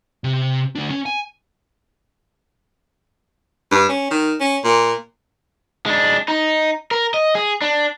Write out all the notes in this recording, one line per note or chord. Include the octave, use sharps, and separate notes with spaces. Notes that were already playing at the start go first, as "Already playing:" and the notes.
C3
D2 D4
C#4
G#5
G2
C#4
D#3
C#4
A#2
G#3 D4
D#4
A#4
D#5
G#4
D4